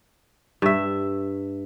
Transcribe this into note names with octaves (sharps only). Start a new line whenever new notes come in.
G2 E5